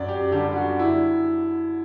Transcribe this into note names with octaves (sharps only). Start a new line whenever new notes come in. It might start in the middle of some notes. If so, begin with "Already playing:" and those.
Already playing: F#2 D5
G4
D3 G3 G4
F#4
E4